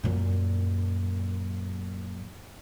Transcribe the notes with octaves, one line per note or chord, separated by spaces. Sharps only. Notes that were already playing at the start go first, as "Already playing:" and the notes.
F#2 A#2